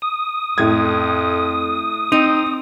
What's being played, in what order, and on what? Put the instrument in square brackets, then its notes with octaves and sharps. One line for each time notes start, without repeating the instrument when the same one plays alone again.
[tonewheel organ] D#6
[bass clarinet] F2 [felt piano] A2 G#6
[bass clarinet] C4 [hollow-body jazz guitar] D#4